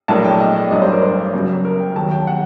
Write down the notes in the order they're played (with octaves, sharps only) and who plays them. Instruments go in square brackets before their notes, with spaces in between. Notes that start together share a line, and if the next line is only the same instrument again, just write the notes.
[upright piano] A#1 A2 F#3 A#3 D4 A5
G5
D#5
D5
A1 G2 F#3 A3 D4 D#5
C5
A#4
C5
F#1 F#2 F#3
A#4
G5
D#2 D#3 F#3 A5
G5
F#5